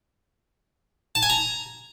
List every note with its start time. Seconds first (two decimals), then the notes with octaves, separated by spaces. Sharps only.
1.15 A5
1.23 G#5
1.30 A#5